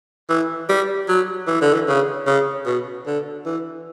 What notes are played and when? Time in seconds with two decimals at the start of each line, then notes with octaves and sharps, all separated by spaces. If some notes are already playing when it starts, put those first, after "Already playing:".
0.29 E3
0.69 G3
1.08 F#3
1.47 E3
1.61 D3
1.74 E3
1.88 C#3
2.27 C#3
2.66 B2
3.06 D3
3.45 E3